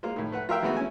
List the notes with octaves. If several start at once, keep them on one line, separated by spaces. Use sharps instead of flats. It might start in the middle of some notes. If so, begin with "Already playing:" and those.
G#3 A#3 F4
A2 D#3
A3 B4 F#5
F4 A#4 E5 G5
E3 G#3 A3 B3 D#4 F#4
C#4 E4 G#5